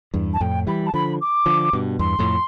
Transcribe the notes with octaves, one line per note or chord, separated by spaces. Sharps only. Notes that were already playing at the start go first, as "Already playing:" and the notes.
E2 G2
A5
F2 A2 G5
E3 G3 B5
A5
D3 F3 B5
D6
D3 F3
G2 B2
E2 G2 C6
F2 A2